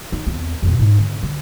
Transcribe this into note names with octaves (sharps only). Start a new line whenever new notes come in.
D#4
E2 C4
F2 B2
G#2
D3 C4
D3